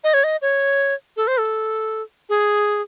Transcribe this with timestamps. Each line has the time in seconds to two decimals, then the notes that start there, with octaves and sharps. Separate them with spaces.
0.04 D#5
0.14 C#5
0.24 D#5
0.42 C#5
1.17 A4
1.28 C5
1.39 A4
2.29 G#4